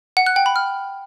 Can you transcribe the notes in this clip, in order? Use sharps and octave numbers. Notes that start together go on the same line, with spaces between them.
F#5
F#6
G5
B5
F6